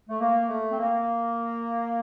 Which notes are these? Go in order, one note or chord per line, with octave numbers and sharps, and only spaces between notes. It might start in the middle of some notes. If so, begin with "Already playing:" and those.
A3
A#3
A3
C4
A#3